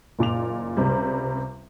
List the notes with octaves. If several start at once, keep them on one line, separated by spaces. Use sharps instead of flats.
F#1 A#2 D6 F7
C#2 C3 G3